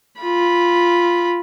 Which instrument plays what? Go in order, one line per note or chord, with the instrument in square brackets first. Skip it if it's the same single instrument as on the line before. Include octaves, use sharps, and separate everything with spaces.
[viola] F4 B5